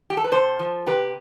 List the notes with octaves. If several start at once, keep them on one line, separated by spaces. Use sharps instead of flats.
G4
A4
B4
C3 A4 C5
F3
C3 G4 B4